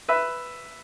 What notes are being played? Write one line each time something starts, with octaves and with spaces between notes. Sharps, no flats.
B4 E5